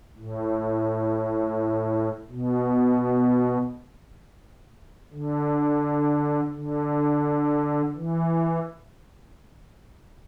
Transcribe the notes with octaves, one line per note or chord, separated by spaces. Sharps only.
A2
B2
D3
D3
E3